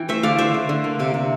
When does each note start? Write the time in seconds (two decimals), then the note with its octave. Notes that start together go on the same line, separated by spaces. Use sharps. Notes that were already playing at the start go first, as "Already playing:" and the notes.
Already playing: E3 G5
0.08 A3 C5 E5
0.23 D3 D5 F5
0.38 D3 C5 E5
0.54 D3
0.69 D3
0.84 A#3
1.00 C3
1.14 C3